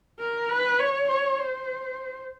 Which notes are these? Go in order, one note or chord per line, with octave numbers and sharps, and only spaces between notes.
A#4
B4
C#5
C#5
C5